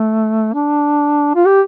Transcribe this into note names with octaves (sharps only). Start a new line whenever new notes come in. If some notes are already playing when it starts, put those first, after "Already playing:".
Already playing: A3
D4
F4
G4